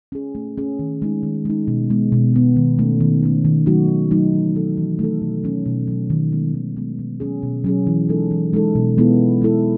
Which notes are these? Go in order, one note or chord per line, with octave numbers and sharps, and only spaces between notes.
C#4 G#4
A3
C#4 G#4
D#3
G#3 D#4
D#3
G#3 D#4
B2
G#3 B3
B2
G#3 B3
D#3
A3 C#4
D#3
A3 C#4
D#3
F#3 A3 D#4 F#4
D#3
F#3 A3 D#4 F#4
E3
A3 D#4 A4
E3
A3 D#4 A4
B2
F#3 C#4
B2
F#3 C#4
D#3
G#3 B3
D#3
G#3 B3
B2
F#3 C#4 G#4
B2
F#3 C#4 G#4
E3
G#3 D#4 A4
E3
G#3 D#4 A4
B2
G#3 B3 E4 A4
B2
G#3 B3 E4 A4